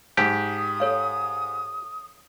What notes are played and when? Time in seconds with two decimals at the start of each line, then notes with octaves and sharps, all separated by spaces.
0.17 G#2 G4 A5 D#6
0.80 A4 C#5 F5